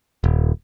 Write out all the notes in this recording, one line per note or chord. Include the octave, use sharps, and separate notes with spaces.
D#1